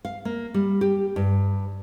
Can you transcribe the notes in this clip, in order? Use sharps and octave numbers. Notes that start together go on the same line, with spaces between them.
F5
A#3
G3
G4
G2